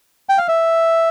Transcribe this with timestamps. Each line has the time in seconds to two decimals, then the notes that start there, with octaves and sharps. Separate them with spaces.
0.29 G5
0.38 F5
0.48 E5